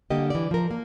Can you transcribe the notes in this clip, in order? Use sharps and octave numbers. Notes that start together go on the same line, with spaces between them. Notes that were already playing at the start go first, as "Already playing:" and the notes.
D3 G3 A#3 G4 D#5
E3 D5
F3 A#4
A#3